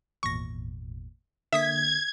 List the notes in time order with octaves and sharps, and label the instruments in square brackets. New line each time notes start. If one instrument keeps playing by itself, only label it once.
[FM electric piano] G#1 E2 A#2 [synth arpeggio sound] C#6 A#6
[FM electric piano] D3 A#3 [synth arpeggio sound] E5 D#6 B6 [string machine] G#6